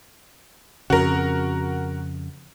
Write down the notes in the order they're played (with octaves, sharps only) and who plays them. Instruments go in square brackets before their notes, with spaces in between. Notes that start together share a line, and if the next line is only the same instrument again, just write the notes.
[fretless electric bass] F2 C#3 [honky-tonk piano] F#4 A#4